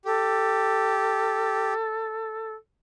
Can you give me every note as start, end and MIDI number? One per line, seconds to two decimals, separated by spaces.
0.05 1.74 67
0.05 2.53 69